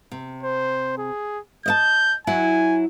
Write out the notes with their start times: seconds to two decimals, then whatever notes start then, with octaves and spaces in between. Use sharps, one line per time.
0.12 C3
0.43 C5
0.98 G#4
1.66 D#5 E5 A5 G6
2.27 F#3 E4 F#4 G#5